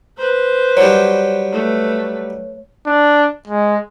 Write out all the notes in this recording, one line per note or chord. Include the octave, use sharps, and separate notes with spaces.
B4 C5
F#3 G3 C#5
A3 B4
D4
G#3